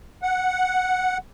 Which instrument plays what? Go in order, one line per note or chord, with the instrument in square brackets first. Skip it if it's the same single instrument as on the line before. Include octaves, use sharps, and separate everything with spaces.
[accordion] F#5